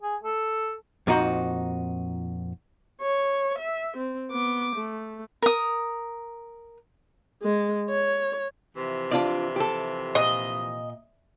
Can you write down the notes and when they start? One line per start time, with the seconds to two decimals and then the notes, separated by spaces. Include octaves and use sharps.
0.03 G#4
0.24 A4
1.07 F2 A#2 D#4 F#4 C5
3.02 C#5
3.59 E5
3.97 C4
4.30 B3 D6
4.76 A3
5.42 A#4 D#6
7.43 G#3
7.89 C#5
8.74 C3 E3 F3
9.11 D4 F4 D5
9.56 G4 A4
10.15 A#2 D#5